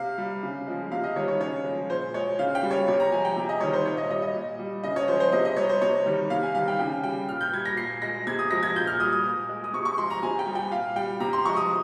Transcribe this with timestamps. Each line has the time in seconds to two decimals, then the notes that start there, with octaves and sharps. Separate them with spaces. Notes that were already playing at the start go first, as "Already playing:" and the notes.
Already playing: C3 F5
0.18 G3
0.43 C#3
0.67 F3 G#3
0.92 C3 F5
1.04 D#5
1.16 D#3 G3 C#5
1.28 C#5
1.40 C#3 C#5
1.65 F3 G#3
1.90 A#2 C5
2.14 G#3 C#5
2.39 C#3 F5
2.55 G5
2.63 G3
2.71 C#5
2.88 C3 C#5
3.00 A#5
3.12 F3 G#3 G#5
3.25 G5
3.36 C3
3.49 D#5
3.60 D#3 G3 C#5
3.73 C5
3.86 A#2 C#5
3.97 D#5
4.09 G3 D#5
4.22 D#5
4.34 A#2
4.59 G3
4.84 C#3 D#5
4.96 C#5
5.08 F3 G#3 C5
5.20 C5
5.32 C3 D#5
5.45 D#5
5.56 G3 C#5
5.69 C5
5.81 C3 C#5
6.06 D#3 G3
6.30 C3 F5
6.43 G#5
6.55 D#3 G3 F5
6.68 G5
6.79 C#3 G5
7.03 G3 G5
7.28 A#2 F6
7.41 G6
7.53 G3 G#6
7.65 A#6
7.77 A#2 C7
8.02 G#3 A#6
8.27 C3 G#6
8.39 D#6
8.51 F3 G#3 A#6
8.63 G#6
8.75 A#2 G6
8.87 F6
9.00 G3 D#6
9.12 D#6
9.25 A#2
9.49 G#3
9.64 D#6
9.74 C3 C#6
9.85 C#6
9.97 F3 G#3 C6
10.10 A#5
10.23 C3 G#5
10.39 G5
10.47 G3
10.55 G5
10.71 A#2 F5
10.96 G3 G5
11.20 C3 A#5
11.33 C6
11.45 F3 G#3 C#6
11.57 D#6